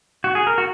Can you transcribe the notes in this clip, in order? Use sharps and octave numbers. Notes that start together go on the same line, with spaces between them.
F#4
G#4
A#4
F#4